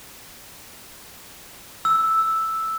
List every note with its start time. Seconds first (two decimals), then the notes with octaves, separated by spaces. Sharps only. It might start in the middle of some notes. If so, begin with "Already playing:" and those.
1.85 E6